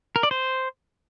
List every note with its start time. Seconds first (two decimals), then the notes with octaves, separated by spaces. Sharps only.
0.16 A#4
0.23 D5
0.31 C5